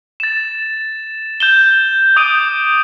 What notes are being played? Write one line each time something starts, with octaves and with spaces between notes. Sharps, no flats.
A6 E7
G6 E7 G7
D6 D#6 G6 D7 D#7